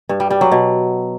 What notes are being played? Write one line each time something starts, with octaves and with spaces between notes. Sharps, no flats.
G2
G3
G3
F#3
B2